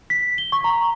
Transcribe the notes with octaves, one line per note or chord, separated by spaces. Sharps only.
B6
G7
C#6
A#5